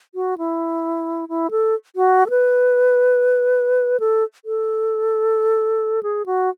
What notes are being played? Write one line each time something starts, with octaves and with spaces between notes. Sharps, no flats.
F#4
E4
E4
A4
F#4
A4
B4
A4
A4
G#4
F#4